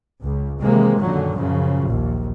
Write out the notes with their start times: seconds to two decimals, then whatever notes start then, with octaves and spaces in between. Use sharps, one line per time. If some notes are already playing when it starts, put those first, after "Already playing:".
0.21 C#2
0.60 C3 D#3 E3 G#3 A#3
0.99 F#2 A#2 D3 D#3 F#3
1.35 F#2 C#3 F3 F#3
1.86 A#1 D#2